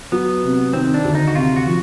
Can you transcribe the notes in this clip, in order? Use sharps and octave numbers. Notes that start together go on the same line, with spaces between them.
F#3 B3
C3
D#3 C4
D4
D2
D#4
F#4
C3 F4
F#4
F3